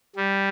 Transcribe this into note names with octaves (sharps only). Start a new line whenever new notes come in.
G3